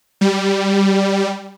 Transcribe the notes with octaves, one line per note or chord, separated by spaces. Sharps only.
G3